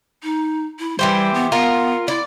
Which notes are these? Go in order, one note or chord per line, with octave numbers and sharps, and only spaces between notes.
D#4
E4
E3 G3 G4 C5
B3
B3 F4 A#4
E4 D5